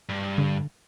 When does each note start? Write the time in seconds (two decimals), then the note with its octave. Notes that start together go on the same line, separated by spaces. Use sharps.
0.09 G2
0.38 D3